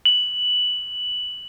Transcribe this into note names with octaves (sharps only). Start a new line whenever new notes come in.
F#7